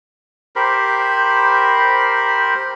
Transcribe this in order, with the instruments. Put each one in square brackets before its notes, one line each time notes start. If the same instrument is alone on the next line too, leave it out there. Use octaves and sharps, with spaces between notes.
[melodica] G4 A#4 C5 B5